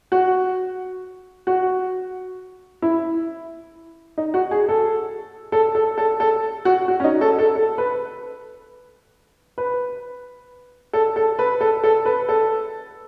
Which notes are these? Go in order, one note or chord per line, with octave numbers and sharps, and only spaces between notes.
F#4
F#4
E4
D#4
F#4
G#4
A4
A4
A4
A4
A4
F#4
F#4
C#4
D#4
A4
A4
A4
B4
B4
A4
A4
B4
A4
A4
B4
A4